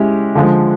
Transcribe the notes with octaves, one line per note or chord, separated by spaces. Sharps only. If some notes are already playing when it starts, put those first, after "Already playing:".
Already playing: G#3 C#4 E4 G4
D3 F3 G#3